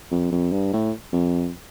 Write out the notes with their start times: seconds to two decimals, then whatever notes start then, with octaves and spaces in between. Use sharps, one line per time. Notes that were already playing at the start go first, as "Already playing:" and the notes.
0.12 F2
0.32 F2
0.52 G2
0.73 A2
1.13 F2